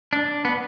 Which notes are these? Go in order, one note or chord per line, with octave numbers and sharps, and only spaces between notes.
D4
B3